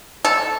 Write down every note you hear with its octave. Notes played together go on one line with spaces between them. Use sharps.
A4